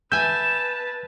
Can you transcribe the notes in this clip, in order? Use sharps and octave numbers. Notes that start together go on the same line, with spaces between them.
B4 E5 G#5 A5 G6 E7